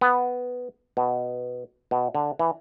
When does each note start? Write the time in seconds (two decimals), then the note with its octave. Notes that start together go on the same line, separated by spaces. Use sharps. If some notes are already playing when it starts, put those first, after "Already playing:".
0.01 B3
0.97 B2
1.91 B2
2.15 D3
2.39 E3